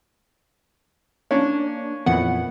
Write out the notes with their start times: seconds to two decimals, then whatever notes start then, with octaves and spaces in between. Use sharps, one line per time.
1.31 A#3 C#4 D4
2.06 F2 A#2 E3 B3 F#5